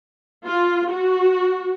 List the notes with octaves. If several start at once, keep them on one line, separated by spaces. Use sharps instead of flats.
F4
F#4